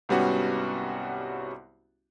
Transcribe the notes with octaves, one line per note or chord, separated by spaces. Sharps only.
C2 G#2 G3 B3 C#4 F#4